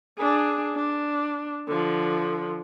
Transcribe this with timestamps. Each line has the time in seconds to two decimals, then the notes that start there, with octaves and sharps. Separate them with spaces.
0.18 D4 G#4
0.75 D4
1.68 D3 F3